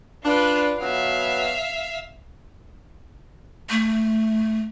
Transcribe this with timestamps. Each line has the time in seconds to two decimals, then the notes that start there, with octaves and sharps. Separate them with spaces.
0.25 D4 F4 B4
0.80 B2 F#3 B3 E5 F5
3.70 A3